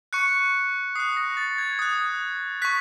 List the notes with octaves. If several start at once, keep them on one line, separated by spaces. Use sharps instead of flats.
C#6 F#6 C#7
D#6 F#6 C7
A#6
A6
G#6
D#6 F#6
C#6 F#6 B6